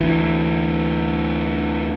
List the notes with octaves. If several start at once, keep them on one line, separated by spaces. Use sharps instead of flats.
D2 E3